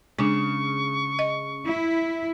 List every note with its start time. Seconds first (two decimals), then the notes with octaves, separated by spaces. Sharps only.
0.19 C#3 G#3 D4 C#6
1.19 D#5
1.67 E4